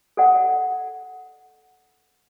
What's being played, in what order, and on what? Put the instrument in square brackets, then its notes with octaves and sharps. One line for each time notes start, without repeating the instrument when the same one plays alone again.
[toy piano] A4 D5 F#5